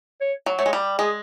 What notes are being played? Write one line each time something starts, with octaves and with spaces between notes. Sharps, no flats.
C#5
F#3
A3 C#5
G#3
G3
G#3 G#4